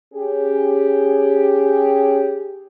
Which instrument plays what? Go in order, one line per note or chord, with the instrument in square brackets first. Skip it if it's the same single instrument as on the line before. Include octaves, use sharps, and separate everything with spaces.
[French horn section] C#4 G4 G#4